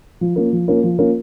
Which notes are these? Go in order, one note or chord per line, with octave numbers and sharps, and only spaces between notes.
F3
A#3 C#4 F4 A#4
F3
A#3 C#4 F4 A#4
F3
A#3 C#4 F4 A#4